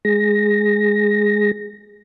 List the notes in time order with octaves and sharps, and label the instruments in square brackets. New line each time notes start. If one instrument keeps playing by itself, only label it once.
[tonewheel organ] G#3 G#4 A#6